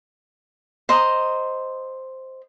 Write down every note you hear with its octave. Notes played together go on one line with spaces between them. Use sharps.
C5 D#5 A#5